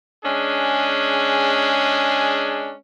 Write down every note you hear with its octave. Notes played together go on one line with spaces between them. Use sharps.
G#3 C#4 D4 G#4